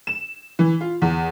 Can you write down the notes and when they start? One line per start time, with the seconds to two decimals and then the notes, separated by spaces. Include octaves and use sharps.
0.07 E7
0.59 E3
0.81 F4
1.02 E2